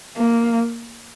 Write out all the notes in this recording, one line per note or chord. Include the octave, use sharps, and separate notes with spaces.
A#3